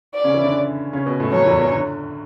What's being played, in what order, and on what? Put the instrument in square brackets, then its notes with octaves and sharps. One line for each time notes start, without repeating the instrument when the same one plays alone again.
[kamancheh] D5
[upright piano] C#3 C#4
E3 E4
D3 D4
C#3 C#4
B2 B3
A2 A3
[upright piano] F#2 F#3 [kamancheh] C#5
[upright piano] E2 E3
E2 E3
D3